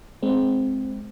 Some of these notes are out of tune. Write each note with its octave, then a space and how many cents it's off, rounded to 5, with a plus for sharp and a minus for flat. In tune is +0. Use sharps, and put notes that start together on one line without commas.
G#3 +25 C4 +0